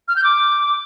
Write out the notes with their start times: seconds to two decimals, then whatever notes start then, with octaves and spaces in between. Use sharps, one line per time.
0.08 F6
0.16 G6
0.24 D6